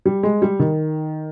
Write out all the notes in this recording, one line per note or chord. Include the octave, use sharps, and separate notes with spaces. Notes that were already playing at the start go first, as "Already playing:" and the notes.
G3
G#3
G3
D#3